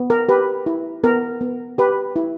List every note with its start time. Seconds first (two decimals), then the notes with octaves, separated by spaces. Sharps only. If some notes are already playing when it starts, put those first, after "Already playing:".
Already playing: B3
0.10 A#4
0.29 G4 B4
0.66 E4
1.03 B3 A#4
1.41 B3
1.78 G4 B4
2.16 E4